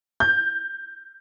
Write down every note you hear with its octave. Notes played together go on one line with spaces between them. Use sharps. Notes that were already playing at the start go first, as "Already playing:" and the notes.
G6